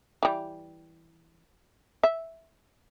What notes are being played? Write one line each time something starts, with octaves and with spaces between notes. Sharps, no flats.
E3 G3
E5